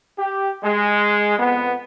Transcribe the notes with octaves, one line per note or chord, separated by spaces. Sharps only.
G4
G#3
F2 B3